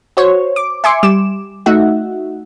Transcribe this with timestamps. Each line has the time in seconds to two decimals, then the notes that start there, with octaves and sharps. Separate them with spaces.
0.17 F#4 C5 C#5
0.56 D6
0.84 E5 G#5 C6 D6 C#7
1.03 G3 D6 E7
1.66 A3 D#4 F#4 E5 F#5